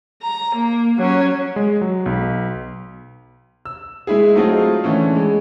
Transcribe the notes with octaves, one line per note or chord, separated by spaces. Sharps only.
A#5
A#3
F#3 C#4
G#3
F#3
B1
E6
G#3 E4 G#4
F#3 A3 C4 D#4 F4 G#4
D3 E3 A3 C#4
G#3